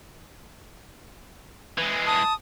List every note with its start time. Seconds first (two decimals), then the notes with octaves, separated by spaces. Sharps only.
1.78 E3 G#3
2.06 A5 D#6